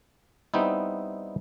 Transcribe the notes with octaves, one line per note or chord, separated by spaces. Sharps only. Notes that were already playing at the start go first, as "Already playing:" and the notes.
G3 B3 C4 D#4 E4